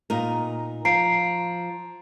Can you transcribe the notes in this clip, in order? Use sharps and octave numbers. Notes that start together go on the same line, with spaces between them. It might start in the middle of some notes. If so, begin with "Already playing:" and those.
A#2 D#4 A#4
F3 A#5 C7 D7